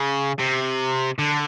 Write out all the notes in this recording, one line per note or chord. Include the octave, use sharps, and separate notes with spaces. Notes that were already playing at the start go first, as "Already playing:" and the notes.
Already playing: C#3
C3
D3